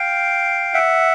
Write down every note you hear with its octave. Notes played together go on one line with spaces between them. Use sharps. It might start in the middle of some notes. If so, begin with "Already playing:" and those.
Already playing: F5 G5
E5 F#5